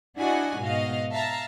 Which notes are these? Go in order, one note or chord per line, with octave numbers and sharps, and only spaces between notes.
D4 E4 F#4 D#5 F#5 G#5
G#2 B2 F#4 D#5 F5
E5 F5 A5 A#5